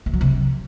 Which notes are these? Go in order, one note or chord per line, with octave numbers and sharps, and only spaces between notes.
E3
F#3
C3